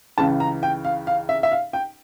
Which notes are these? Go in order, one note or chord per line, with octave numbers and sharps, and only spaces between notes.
C#2 C#3 E3 A5
A#5
G5
F5
F5
E5
E5
F5
G5